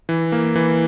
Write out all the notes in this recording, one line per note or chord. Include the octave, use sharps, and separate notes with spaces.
E3
A#3
E3